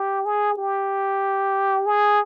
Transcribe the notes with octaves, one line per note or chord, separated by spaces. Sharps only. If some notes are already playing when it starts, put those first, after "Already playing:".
Already playing: G4
G#4
G4
G#4